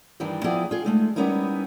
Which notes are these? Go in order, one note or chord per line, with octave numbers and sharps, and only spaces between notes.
G2 D#3 E3 G3 D4
F3 B3 E4 G#4 D5 G5
F4 G#4
G#3 A3 D#4
G3 B3 C#4 D#4 E4 A#4